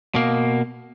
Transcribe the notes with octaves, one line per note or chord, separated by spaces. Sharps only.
B2 A#3